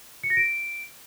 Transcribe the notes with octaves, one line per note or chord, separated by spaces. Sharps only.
C#7
A#6
D7